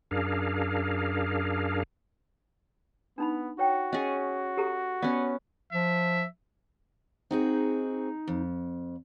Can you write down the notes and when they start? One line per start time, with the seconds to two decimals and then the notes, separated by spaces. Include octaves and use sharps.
0.11 F#2 D4 G#4 A#4 F5
3.18 B3 D4 D#4 B5
3.59 F#4 C#5 G5
3.93 C#4 G#4 D#5
4.57 G4 A4 A#5
5.02 B3 C#4 D5
5.73 F3 E5
7.31 C4 D#4 F#4 G#4
8.28 F2